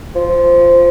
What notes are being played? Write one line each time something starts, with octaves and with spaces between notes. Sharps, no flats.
F3